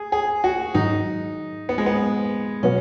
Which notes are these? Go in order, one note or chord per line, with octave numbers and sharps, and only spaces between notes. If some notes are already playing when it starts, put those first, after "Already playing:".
Already playing: G#4
G#4
F#4
G#2 D#3 F#3 D#4
B3
G#3
B3
B2 F#3 B3 C#4 F#4